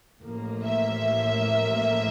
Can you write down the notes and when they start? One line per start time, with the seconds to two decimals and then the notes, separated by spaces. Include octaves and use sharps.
0.21 A1 A2 F3 A#3
0.64 E5